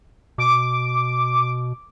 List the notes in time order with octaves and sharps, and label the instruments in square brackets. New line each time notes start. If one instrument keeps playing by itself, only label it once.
[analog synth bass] B2 [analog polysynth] D6